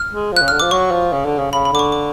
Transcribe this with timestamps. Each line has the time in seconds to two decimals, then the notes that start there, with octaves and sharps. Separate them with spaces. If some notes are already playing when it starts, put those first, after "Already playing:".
Already playing: F6
0.11 G#3
0.32 F3 F#6
0.42 C#3
0.48 D3 F6
0.60 F3 D6
0.71 F#3 C#6
0.91 F3
1.12 C#3
1.25 D3
1.38 C#3
1.52 C#3 B5
1.65 B5
1.72 D3 D6
1.79 C#6
1.92 D6